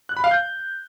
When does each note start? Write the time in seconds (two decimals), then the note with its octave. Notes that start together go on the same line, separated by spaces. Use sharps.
0.09 F#6
0.17 B5
0.24 F5
0.31 G6